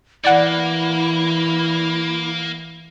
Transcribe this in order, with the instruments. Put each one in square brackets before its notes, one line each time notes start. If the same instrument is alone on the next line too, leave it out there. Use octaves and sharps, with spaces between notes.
[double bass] E3 [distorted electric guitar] A#3 [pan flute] E4 [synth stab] D5 F#5